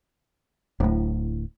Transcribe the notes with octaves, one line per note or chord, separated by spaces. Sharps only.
D1 A2